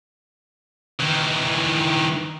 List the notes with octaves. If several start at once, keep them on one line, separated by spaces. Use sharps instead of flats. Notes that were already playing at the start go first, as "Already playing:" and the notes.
D#3 E3